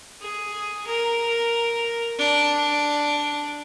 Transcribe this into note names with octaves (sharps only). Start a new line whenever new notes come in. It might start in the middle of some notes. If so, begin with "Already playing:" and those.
G#4
A#4
D4